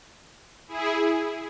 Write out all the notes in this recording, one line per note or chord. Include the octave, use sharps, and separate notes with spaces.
E4 G#4